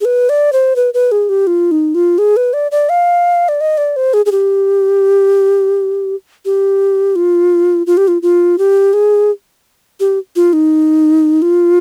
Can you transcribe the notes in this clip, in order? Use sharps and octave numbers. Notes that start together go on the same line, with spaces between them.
G#4
B4
D5
C5
B4
B4
G#4
G4
F4
D#4
F4
G#4
B4
D5
D5
F5
D5
D#5
D5
C5
G#4
G#4
G4
G4
F4
F4
G4
F4
F4
G4
G#4
G4
F4
D#4
F4